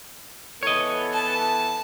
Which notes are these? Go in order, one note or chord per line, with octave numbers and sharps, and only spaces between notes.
E3 B3 A4 C#5 D#5
A5